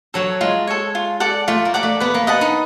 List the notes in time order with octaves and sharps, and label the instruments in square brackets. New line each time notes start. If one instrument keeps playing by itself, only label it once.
[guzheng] F#3 [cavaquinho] A4 C#5
[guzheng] G#3 [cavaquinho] F4
[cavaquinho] A4 C#5
F4
A4 D5 F#5
[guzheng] A3 [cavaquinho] F4
[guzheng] A#3
[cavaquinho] A4 D5 F#5
[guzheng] A3
[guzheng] B3 [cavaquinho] B4
[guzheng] A#3
[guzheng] B3 [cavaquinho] D#5 F#5 A5
[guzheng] D#4